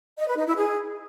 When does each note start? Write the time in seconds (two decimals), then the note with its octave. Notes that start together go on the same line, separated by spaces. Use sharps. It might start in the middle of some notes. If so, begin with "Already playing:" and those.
0.18 D#5
0.27 B4
0.37 D#4
0.46 E4
0.56 G#4